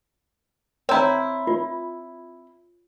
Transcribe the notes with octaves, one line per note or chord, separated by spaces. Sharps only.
C4 E4 C#5 A#5
F4